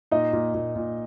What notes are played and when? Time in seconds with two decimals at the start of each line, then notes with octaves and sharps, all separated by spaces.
0.11 A#2 D#4 D#5
0.33 A#2
0.54 A#2
0.76 A#2